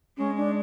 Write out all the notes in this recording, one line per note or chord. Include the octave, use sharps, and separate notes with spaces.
G#3 C#4
D4